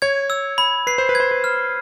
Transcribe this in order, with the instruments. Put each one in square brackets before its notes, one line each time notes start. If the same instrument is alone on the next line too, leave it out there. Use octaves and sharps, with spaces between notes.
[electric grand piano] C#5 [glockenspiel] G#6
[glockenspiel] E6
B5
[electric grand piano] B4 [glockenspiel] C7
[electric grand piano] C5
B4
[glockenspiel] G#6
[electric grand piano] C5
B4
[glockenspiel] F6